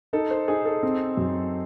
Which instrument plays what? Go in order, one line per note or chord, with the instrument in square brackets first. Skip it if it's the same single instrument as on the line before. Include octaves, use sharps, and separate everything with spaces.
[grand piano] D#4 [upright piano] A4
[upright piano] C5
[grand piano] D#4 [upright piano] G#4
[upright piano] A4
[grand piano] C4
F#2